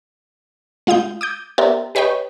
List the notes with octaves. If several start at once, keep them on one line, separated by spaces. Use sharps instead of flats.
G#3 F4 F5 D#6 G6
D6 D#6 G6
B3 G4 A#4 C5 D5 E5
G4 B4 C#5 D#5 G5